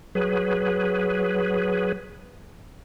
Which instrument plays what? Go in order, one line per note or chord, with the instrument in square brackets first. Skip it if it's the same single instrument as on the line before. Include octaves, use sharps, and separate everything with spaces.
[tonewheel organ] F#3 G#4 B4